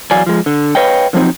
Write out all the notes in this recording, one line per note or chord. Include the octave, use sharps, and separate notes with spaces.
E2 F#3 D5 F5 G#5
F3 G#3
D3
B4 C#5 D#5 F5 G5
D3 F3 F#3 C4 D#4